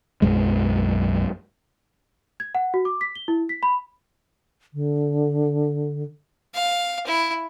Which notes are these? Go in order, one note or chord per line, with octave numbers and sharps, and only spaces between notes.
B1 F#2 G#3
G#6
F#5
F#4
D6
B6
G7
E4
B6
B5
D3
F5
E4